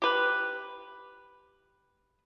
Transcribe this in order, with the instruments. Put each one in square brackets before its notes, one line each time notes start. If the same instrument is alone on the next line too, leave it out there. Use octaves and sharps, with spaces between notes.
[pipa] G4 B4